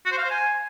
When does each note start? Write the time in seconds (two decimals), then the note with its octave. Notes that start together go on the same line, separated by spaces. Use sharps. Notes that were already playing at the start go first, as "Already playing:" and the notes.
0.05 F#4
0.12 C5
0.18 F5
0.24 C5
0.30 G#5